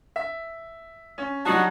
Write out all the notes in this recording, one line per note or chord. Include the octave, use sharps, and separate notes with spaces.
E5
C#4
F#3 G3 D4 D#4 F#4